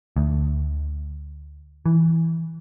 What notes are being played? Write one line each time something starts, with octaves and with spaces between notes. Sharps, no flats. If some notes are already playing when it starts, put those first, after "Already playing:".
D2
E3